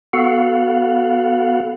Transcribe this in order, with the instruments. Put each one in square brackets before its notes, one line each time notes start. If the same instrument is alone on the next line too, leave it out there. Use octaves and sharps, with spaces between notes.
[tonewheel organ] B3 F#4 A4 F5 F#5